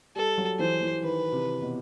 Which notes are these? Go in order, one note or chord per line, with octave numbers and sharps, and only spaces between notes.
G3 A4
F#3
E3 C5
E3
D#3 B4
C3
B2